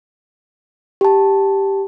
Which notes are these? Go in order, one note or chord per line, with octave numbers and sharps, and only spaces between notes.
G4 A5